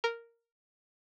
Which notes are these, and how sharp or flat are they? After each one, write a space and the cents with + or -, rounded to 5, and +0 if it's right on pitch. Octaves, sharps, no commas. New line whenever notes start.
A#4 -5